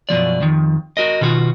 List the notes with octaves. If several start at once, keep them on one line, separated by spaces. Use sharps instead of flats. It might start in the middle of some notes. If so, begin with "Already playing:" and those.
F#2 B2 F3 D5
F2 D#3
F#4 A#4 D#5
B2 D#3 F4 F#4